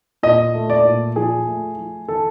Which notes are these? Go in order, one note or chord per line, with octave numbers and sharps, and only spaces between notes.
A#2 D#5
A3
D5
A#2
F3 G#4
A3
F3
E3 A4